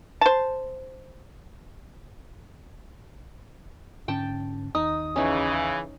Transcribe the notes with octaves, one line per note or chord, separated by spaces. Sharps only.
C5 A5
G#2 D3 C#4 G5 A5
D#2 D#4 D#6
C#3 E3 C#4 D#4